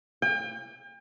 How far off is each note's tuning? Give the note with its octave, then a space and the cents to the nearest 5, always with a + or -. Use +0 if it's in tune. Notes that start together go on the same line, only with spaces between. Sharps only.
G5 +40